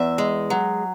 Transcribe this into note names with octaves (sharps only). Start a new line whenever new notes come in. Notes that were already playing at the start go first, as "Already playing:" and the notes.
Already playing: E2 E5
G#3
F#3